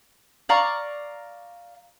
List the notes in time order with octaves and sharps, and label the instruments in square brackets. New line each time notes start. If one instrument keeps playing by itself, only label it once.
[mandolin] D5 F5 A#5 C#6